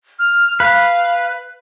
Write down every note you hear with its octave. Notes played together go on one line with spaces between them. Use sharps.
F6
B4 F5